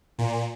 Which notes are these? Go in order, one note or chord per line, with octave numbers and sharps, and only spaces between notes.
A#2